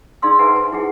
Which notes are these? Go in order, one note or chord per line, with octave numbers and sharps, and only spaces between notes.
D#4 G#4 D5 F5 C6 E6
B4 C5 E5 F#5 G#5 A#5
A5
E4 G#4 F#5